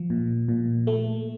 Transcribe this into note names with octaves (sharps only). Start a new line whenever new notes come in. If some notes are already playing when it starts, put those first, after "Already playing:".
Already playing: F3
A#2
A#2
A3